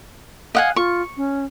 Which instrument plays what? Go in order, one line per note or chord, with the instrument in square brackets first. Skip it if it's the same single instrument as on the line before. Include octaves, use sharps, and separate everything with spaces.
[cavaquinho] D#5 F#5 G#5 [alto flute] F5
[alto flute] F4 [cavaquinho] C#6
[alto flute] C#4